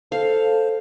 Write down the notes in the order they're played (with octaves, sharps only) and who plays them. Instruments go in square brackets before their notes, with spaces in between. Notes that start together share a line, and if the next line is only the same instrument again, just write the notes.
[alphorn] A4 [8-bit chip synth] C5 [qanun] F5